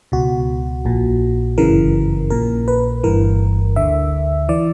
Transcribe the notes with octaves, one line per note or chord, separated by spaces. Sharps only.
C#2 B2 F#4
A#1 A#2
G1 F#2 C#3 E3 A#4
A#1 A#2 A#4
B4
G1 G2 E3 A#4
D2 D3 E5
E3 D5